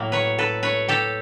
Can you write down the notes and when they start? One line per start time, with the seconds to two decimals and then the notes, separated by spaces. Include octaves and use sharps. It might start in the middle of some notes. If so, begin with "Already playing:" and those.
Already playing: A2 F#3 A#3
0.12 B4 C#5
0.38 A4 B4
0.63 B4 C#5
0.88 G4 A4